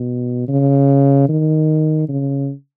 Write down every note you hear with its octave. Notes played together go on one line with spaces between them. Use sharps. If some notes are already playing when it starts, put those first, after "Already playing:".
Already playing: B2
C#3
D#3
C#3